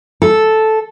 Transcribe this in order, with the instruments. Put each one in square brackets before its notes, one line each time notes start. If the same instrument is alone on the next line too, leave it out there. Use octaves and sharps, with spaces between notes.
[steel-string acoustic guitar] A4